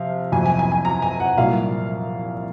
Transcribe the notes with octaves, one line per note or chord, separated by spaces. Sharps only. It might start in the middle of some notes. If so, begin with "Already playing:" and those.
Already playing: C3 F3 F5
F2 C3 F#3 G#5
G#5
G#5
G#5
A#5
G#5
F#5
C2 A#2 F#3 F5